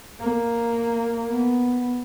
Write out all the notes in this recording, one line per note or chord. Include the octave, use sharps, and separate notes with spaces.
A#3
B3